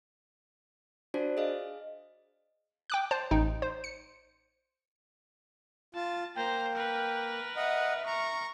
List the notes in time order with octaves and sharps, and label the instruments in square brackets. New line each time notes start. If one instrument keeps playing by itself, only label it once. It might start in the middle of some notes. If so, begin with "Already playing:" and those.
[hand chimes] D4 F4 F#4 C5 D5 A5
G#4 D#5 F5
[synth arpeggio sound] G5 D6 F#6
C5 A5
A1 D#4 G5
C5
C#7
[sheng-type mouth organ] F4 [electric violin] A5
[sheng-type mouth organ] A#3 [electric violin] C5 A#5 [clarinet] G5
[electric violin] A#4 B4
[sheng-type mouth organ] D#5 F#5 [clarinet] E5
[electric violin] A#4 C#6 [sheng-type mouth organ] A#5